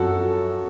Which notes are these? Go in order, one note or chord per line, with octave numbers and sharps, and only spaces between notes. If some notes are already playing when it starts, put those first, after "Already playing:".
Already playing: F#2 F3 F#4 A4